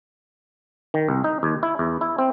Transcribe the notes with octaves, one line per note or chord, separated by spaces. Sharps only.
D#3
C2
D#4
D#2
E4
E2
E4
C4